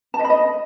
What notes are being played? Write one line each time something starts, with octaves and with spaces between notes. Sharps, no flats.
A5
D#5
B5
D#5